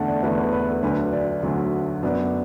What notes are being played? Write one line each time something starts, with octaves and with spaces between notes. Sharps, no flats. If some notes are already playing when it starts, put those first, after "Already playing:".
Already playing: E2 D3 A3 D4 F#5 A5
D5
E2 D3 A3 D4 B4
B4
B4
A4
D2 D3 F#3 D4 B4
D5
D2 D3 F#3 D4
F#2 F#3 B3 D4